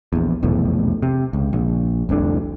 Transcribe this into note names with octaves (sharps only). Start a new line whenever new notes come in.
A#1 E2
F1 B1 E2 A2
C3
C#2
A#1
F1 C2 B2 D3